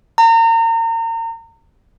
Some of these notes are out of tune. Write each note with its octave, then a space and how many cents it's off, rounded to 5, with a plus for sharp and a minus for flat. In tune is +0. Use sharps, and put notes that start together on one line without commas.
A#5 -35